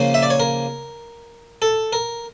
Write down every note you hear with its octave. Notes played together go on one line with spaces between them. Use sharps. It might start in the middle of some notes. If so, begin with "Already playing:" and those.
Already playing: C#3 F3 A#3 C#4 C#5
E5
D5
C#5
A#4
A4
A#4